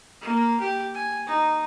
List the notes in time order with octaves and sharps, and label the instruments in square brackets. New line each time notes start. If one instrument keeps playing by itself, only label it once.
[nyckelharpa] A#3
G4
G#5
D#4